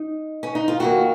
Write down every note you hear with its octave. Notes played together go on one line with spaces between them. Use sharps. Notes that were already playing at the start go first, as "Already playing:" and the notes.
Already playing: D#4
C#4
D#4
F4
F2 D#3 A#3 F#4